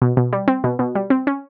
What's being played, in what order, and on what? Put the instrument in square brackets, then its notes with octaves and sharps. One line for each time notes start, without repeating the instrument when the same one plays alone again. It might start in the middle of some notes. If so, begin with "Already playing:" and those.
[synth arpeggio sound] B2
B2
G3
C4
B2
B2
G3
C4
C#4